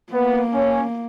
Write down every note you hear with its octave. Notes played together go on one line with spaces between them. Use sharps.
A#3 B3
C#4